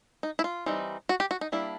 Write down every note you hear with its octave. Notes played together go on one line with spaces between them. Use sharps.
D#4
E4
F4
E3 G3 C4 D#4
F#4
G4
F#4
D#4
G3 A#3 D4 E4